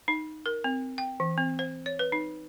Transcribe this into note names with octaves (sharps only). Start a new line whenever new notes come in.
D#4
A#4
C4
G5
E3
C4
C5
C#5
B4
D#4